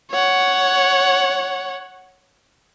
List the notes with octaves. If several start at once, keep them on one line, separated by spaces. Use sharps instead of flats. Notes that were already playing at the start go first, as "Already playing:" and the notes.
C#5 F#5